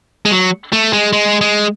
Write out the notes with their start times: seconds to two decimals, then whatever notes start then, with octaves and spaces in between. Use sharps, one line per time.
0.25 G#3
0.31 F#3
0.73 A3
0.93 G#3
1.13 G#3
1.41 G#3